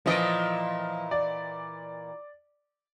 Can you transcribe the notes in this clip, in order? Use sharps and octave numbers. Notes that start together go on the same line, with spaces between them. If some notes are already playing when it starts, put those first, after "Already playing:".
A#2 E3 F3 D#5 D7
D5